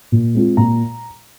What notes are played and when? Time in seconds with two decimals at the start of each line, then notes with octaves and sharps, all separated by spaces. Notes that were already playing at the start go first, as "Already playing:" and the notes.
0.12 A#2
0.35 G#3 C4 F4
0.57 A#2 A#5